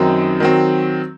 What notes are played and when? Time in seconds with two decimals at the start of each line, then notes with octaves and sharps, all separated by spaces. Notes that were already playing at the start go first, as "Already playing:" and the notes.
Already playing: F#2 D#3 F#3 C4 D#4
0.40 D#3 F#3 C4